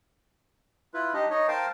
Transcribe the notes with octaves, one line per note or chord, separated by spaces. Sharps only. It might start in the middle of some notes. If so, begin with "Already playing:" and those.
E4 F4 B4
D4 D#4 G4 D#5
D#4 C#5 D#5
A#4 C5 F5 G5 A5